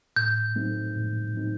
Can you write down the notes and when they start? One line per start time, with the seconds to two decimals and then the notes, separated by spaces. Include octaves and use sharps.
0.16 A2 G6
0.56 F#3 A3 C4 D#4
0.95 A2
1.35 F#3 A3 C4 D#4